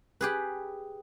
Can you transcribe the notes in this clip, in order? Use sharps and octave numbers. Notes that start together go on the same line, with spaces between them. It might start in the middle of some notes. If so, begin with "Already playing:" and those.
G4 G#4 B4